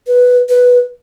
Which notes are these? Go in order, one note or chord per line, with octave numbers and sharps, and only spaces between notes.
B4
B4